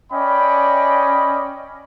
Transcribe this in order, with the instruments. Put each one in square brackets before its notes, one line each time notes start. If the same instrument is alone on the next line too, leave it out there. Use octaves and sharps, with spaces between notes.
[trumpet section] C#4 D5 D#5 G5 B5